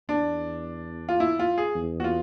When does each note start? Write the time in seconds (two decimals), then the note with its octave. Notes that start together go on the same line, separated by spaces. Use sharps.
0.09 E2 D4
1.09 F4
1.20 E4
1.39 F4
1.58 G#4
1.76 E2
2.00 F#4
2.04 F4